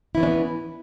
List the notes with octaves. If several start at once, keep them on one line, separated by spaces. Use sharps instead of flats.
E3 B3 C#4 D4 E4